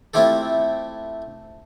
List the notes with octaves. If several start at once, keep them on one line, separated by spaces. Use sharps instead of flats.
A3 C4 E4 F4 G4 A4